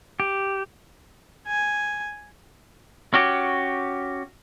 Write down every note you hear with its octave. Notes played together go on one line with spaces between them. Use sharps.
G4
G#5
C#4 F#4 G4